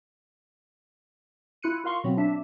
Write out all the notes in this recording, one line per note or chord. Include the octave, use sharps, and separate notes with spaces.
E4 F4 F#6 C#7 D#7
F4 A#4 F5 C6 C#6
B2 F#3 B3 C4
D4 E5